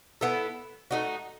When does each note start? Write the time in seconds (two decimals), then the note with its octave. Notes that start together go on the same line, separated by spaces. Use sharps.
0.21 B3 E4 A4
0.91 A3 D#4 F#4